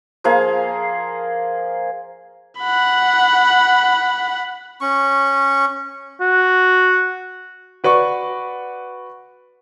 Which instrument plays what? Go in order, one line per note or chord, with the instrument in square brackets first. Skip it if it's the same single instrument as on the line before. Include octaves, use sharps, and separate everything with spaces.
[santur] F3 A#3 G#4 F5
[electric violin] F#5 B5
[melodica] C#4 C#6
[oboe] F#4
[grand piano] F#4 B4 D5 C#6